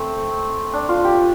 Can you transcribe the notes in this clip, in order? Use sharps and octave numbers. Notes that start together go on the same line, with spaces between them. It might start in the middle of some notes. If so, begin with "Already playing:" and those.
Already playing: A3 C4
D4
F4
G4